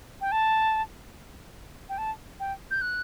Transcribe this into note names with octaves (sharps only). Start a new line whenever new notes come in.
G5
A5
G5
A5
G5
G6
F#6